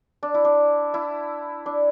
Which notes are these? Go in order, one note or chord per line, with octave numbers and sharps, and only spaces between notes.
D4
E4
D4
E4
D4